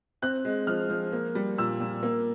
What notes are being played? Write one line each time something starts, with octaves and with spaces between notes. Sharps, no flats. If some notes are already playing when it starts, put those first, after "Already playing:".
C4 F#6
G#3
F3 F6
F3
A#3
G3
A#2 E6
A#2
A#3